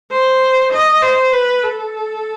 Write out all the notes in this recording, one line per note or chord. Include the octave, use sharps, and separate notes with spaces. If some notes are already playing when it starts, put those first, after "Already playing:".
C5
D#5
C5
B4
A4